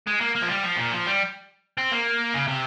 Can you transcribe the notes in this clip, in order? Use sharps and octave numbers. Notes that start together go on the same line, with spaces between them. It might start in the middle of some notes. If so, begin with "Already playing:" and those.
G#3
A#3
A#3
F3
G3
F3
A#2
F3
G3
C4
A#3
C#3
C3